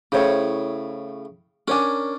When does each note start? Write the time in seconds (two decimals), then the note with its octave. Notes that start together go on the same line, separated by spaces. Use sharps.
0.12 A2 C#3 E4 C5 C#5
1.68 C#4 D4 A#4 C#5 G#5